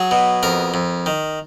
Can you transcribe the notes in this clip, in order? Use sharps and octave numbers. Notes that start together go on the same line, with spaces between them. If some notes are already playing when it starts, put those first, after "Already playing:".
Already playing: F#3 G#4
B2
F2 A#4
F2
D#3